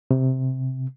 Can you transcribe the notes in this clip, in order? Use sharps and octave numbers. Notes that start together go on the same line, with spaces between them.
C3